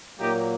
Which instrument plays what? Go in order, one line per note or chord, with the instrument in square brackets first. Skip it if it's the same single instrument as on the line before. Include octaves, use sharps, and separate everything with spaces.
[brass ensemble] A#2 F#3 A#3 D#4 G4